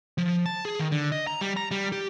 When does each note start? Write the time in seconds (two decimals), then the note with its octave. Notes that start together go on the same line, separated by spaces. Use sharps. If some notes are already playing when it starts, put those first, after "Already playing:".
0.18 F3
0.46 A5
0.65 G#4
0.79 D#3
0.92 D3
1.12 D#5
1.27 A#5
1.41 G3
1.57 A#5
1.71 G3
1.92 G4